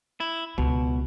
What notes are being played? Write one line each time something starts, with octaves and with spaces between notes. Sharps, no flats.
E4
C#2 B2